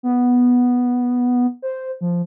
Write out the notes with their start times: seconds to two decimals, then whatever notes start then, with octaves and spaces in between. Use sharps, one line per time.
0.03 B3
1.62 C5
2.01 F3